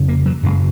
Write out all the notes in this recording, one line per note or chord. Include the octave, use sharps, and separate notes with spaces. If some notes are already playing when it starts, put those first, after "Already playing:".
Already playing: F2 C#3
A#3
F#3
F#2 C#3 G#3